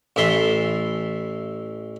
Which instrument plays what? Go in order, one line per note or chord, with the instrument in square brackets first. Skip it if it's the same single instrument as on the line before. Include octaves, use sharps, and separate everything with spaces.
[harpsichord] A1 E3 A4 E5 C6